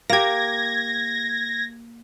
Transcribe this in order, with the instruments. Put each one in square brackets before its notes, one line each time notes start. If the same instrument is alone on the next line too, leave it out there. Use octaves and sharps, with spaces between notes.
[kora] A#3 G4 [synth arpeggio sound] G#6 A#6